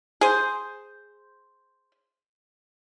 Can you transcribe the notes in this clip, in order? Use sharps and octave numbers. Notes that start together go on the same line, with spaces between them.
G#4 C5